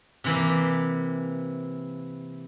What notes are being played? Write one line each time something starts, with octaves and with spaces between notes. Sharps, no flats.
C3 E3 A#3